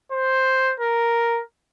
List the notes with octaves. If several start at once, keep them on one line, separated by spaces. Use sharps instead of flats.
C5
A#4